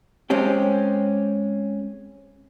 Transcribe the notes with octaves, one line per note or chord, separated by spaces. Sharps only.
G#3 C4 C#4 G4